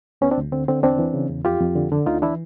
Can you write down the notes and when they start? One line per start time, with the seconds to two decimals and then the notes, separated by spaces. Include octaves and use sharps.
0.21 D2 B3 C#4
0.31 C4 D4
0.37 D2
0.52 D3 C4
0.68 D3 C4
0.83 E2 C4 D4
0.99 E3
1.14 C#3
1.30 E2
1.45 F2 F4 G4
1.60 F2
1.76 D3
1.92 D3
2.06 D2 D#4 F4
2.22 E3 D4 E4